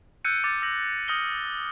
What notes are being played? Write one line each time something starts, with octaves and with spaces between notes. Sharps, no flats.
E6 F#6 G6 A6 C#7 D#7
D6 F6 A6
E6 G6 A#6 F#7
D#6 F6 G6 A#6 C#7 G7
E6